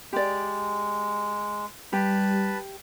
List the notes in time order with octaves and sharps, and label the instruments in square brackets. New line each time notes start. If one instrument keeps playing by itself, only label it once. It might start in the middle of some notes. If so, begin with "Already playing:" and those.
[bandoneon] G#3 [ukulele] G4 D5
[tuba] G3 [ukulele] G4 [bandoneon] B4 A5 B5